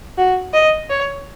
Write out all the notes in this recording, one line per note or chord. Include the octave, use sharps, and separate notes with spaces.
F#4
D#5
C#5